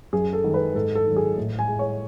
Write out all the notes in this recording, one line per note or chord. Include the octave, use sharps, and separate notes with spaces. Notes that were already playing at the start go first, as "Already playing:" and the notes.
F#2 G#4
A4
D#3 G#3
B4
G#2 A4
A4
D#3 F#3
G#4
A2
G#5
G#3
C#5